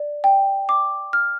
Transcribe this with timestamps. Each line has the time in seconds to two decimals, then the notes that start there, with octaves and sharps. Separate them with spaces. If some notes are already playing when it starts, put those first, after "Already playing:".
Already playing: D5
0.24 G5
0.69 D6
1.13 F6